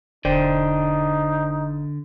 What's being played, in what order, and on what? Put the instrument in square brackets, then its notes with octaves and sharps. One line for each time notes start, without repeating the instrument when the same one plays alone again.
[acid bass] E1 [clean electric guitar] D3 [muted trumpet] D#4 [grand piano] C5 D5 G5